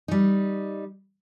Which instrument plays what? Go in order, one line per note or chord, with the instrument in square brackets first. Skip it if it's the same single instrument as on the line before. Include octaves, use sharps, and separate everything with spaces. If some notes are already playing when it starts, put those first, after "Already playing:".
[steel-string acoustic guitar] G3 D#4